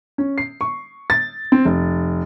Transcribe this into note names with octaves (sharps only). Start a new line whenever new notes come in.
C#4
C7
C#6
A6
C4
F1